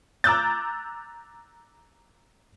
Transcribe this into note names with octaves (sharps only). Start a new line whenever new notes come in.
A#5 D6 E6 F#6 G6 A6